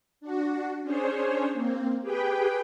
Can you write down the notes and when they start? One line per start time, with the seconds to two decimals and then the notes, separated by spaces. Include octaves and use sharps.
0.21 D4 F#4
0.82 C#4 D4 G#4 C5 C#5
1.53 A#3 C4
2.02 G4 G#4 B4 G5